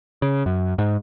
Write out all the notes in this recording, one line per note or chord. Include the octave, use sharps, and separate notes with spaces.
C#3
F#2
G#2